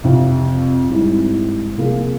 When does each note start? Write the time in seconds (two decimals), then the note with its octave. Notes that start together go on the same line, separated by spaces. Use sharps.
0.04 F2 C3 F3
0.90 G#2 G3 C4 E4
1.77 C3 F3 A#3 F4 G#4